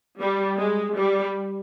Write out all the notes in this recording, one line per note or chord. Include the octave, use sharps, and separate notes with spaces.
G3
G#3
G3